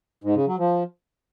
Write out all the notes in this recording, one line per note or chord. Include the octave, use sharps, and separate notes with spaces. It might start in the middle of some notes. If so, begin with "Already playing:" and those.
G#2
C#3
F#3
F3